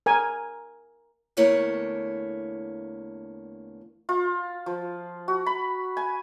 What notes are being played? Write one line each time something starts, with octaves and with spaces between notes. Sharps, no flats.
A#4 G#5
E2 D3 A3 A#3 E4 C#5
F4
F3
F#4
B5
G#5